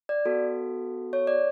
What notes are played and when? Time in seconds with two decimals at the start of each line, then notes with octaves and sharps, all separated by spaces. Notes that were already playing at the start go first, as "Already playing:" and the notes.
0.09 D5
0.26 B3 F#4 A4
1.13 C#5
1.27 D5